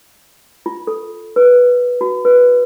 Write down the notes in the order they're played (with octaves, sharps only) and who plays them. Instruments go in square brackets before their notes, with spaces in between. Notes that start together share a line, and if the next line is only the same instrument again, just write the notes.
[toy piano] F4
A4
B4
F#4
B4